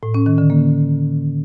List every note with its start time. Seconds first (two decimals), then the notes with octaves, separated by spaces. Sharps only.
0.03 A2
0.14 C#4
0.26 D#3
0.38 D3
0.50 A#3